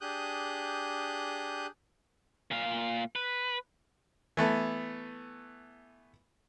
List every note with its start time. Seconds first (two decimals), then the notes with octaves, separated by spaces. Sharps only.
0.01 D4 G4 G#4 D#6 F#6 G6
2.51 A#2 F5
3.16 B4
4.37 E3 A3 B3